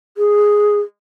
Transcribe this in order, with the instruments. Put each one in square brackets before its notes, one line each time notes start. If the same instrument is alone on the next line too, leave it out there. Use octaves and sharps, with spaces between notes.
[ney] G#4